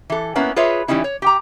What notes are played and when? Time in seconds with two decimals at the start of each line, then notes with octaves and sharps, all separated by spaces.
0.10 E3 A4
0.35 A#3 B3 C#4 E4
0.56 F4 G#4 B4 C#5 E5
0.88 E3 G3 C#4 D#4 E4
1.04 C#5
1.22 G4 G5 A#5